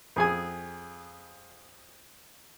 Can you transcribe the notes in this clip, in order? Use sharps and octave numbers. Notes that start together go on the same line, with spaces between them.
F2 G#4 G#5